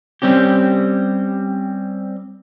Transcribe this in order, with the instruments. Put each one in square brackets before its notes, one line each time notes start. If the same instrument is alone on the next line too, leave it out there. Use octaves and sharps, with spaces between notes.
[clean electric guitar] G3 C4 C#4 G4